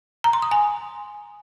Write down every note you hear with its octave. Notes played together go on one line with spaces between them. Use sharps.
A#5
C6
D#6
G#5